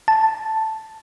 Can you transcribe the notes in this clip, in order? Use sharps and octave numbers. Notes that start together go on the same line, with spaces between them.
A5